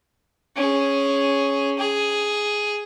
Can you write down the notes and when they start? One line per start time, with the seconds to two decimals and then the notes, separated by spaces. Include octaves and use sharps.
0.56 C#4 G#4
1.78 G#4